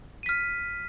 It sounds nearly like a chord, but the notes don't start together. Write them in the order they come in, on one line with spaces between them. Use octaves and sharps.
D#7 B6 F6